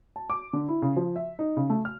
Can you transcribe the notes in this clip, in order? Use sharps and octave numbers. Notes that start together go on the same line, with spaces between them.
A5
D6
D3
E4
C#3
F3
E5
D#4
C#3
A3
F6